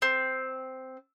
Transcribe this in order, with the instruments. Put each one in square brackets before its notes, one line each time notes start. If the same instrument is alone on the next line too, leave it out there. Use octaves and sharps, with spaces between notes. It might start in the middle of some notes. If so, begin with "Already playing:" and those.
[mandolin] C4